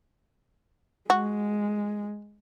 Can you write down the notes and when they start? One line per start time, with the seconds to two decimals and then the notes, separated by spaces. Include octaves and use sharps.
1.10 G#3 F#4